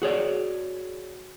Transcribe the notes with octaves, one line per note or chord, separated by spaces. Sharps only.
F#4 G#4 C#5 D5